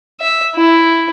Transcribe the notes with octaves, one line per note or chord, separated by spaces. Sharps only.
E5
E4